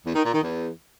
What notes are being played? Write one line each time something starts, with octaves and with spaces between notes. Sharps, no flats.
E2
D#3
A#2
D#3
E2